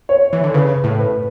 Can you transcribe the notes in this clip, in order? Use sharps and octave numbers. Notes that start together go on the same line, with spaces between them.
C#5
E3
D3
C#3 B4
A2
B4